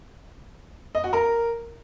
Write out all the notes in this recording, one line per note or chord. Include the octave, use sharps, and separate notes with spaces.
D#5
F#4
A#4